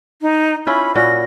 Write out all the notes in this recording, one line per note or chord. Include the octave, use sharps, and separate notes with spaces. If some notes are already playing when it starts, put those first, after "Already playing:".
D#4
C#4 E4 F4 B5
A#2 C#4 F#4 A#6